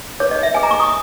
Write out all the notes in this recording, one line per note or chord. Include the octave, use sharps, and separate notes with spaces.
D#4 G#4 B4 C#5
D#5
E5
D#4 G#4 B4 G#5
A#5
C#6
D#6